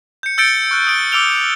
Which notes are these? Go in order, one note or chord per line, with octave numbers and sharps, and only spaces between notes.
G6 C#7
E6 G6 A6 C#7 D7 G7
C#6 F6 F#6
D#6 D7 G7
D6 E6 F6 D7 F7 G7
F7